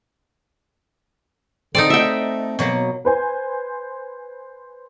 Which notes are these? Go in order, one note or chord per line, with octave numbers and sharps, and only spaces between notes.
D3 C4 D#4 A4 D5
A3 E5 G5
B2 F#3 A#3 B3
B4 C5 G#5